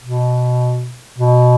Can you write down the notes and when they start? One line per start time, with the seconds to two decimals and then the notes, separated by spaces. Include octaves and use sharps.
0.02 B2
1.18 B2